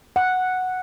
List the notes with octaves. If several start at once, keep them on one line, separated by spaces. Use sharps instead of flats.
F#5